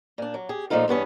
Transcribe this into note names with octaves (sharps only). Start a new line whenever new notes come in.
A#2 D4
F#3
G4 G#4
A#2 C#3 F3 A3 D#4 F4
E2 G2 B3 C#4